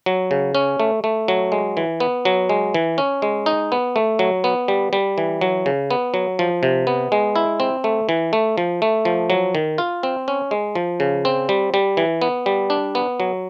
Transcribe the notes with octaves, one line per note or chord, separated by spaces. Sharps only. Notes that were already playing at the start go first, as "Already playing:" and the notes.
F#3
C#3
C#4
A3
A3
F#3
G#3
E3
B3
F#3
G#3
E3
C#4
G#3
D#4
B3
A3
F#3
B3
G3
G3
E3
F#3
C#3
B3
F#3
F3
C3
B3
G#3
E4
C4
A3
E3
A3
F3
A3
F3
F#3
D#3
F4
C4
C#4
G#3
F3
C#3
C4
G3
G3
E3
B3
G3
D4
B3
F#3